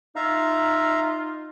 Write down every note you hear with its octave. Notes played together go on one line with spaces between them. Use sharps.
D#4 F4 E5 F5 A#5